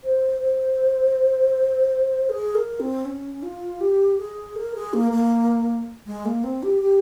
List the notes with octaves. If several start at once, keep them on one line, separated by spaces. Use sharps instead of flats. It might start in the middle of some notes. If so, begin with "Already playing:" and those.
C5
C5
G#4
A#4
C4
C#4
F4
G4
G#4
A#4
G#4
A#3
A#3
G#3
A#3
C4
G4
G4